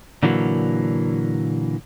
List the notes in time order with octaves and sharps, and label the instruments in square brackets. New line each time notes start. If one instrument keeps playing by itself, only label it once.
[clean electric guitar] A#2 D3 E3 F#3 A#3